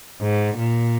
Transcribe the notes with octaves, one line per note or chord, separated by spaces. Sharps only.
G#2
A#2